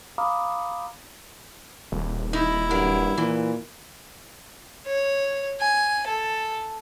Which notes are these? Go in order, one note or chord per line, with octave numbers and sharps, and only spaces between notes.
F5 A#5 B5 D6 D#6 F6
D#1
D#4 E4
G2 F#3 A#4
A#2 E3
C#5
G#5
A4